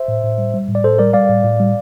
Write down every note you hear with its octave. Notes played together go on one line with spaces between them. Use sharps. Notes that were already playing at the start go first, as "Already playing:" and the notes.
Already playing: C5 E5
A2
A2
G3
G3
A2
D5
A2 A4 C5
G3 A#4 D5
G3 D5 F5
A2
A2
G3